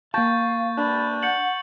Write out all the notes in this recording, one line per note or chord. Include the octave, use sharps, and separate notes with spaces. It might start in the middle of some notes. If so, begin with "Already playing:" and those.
A#3 F5 G5 A5 C#6 G6 A6
D4 B5
F#5 G6 C#7 F#7